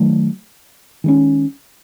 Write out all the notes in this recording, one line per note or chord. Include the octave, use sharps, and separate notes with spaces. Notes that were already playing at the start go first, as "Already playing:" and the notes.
Already playing: D#3 F#3 A3
D#3 G#3 C#4